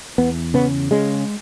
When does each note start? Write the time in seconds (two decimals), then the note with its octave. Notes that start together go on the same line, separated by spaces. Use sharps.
0.18 E2 B3
0.54 C#3 B3
0.91 C#3 G#3